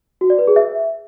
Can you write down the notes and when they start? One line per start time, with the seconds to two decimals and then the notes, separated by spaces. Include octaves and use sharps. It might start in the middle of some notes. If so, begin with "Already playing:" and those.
0.21 F#4
0.30 D5
0.39 B4
0.47 G#4
0.56 E5